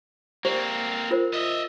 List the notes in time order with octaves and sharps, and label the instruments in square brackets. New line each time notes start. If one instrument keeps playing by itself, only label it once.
[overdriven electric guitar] A#3 C4 [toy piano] G4 C5 D5
[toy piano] F4 A#4 C5
[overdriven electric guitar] D#5 E5